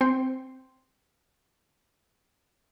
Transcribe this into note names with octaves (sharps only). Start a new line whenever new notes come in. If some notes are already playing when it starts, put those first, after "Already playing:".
C4 G5 C6